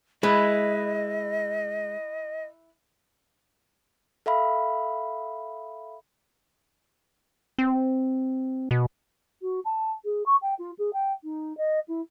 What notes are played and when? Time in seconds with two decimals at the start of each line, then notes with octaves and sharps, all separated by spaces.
0.23 G#3 E4 B4 D#5
4.26 A4 E5 F5 B5
7.58 C4
8.71 B2
9.42 F#4
9.65 A5
10.04 G#4
10.26 C#6
10.42 G5
10.59 F4
10.78 G#4
10.93 G5
11.23 D#4
11.57 D#5
11.88 E4